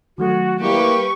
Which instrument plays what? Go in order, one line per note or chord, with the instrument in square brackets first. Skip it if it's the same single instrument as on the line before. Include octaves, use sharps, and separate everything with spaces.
[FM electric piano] D#3 F#3 A3 [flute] F#4
[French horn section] G3 A#3 E4 [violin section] G4 B4 [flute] C#6